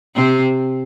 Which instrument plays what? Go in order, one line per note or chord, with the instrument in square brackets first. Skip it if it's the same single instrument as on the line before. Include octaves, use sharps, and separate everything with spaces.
[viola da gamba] C3 C4